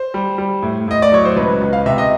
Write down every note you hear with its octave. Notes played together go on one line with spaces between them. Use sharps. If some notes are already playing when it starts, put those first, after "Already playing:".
Already playing: C5
G3
G3
A2
A2 D#5
D5
F#3 C#5
C5
C#2 B4
C#2
F5
C3 E5
D#5